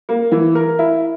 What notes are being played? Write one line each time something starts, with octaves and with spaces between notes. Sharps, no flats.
A#3
E3
A#4
E4